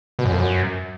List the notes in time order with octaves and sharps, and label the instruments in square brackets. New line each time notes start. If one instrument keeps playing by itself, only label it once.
[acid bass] B2
F#2
F2
F#2